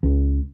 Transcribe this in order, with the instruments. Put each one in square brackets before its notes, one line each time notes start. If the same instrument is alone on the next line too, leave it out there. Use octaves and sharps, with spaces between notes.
[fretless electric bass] C#2